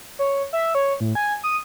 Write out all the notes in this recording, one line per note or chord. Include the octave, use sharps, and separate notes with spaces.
C#5
E5
C#5
A2
G#5
D#6